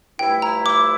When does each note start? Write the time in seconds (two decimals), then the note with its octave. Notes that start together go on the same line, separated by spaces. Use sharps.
0.19 G2 F3 A3 E4 G5
0.42 A#5
0.66 D6